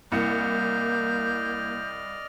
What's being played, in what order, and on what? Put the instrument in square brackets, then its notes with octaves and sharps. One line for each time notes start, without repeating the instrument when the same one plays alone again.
[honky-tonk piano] C2 E4 C#7 [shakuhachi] A#3 [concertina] D5 D#5 F6 [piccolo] G6